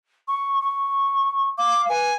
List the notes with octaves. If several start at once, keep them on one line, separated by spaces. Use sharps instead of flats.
C#6
C#6
F5 D6
B4 G#5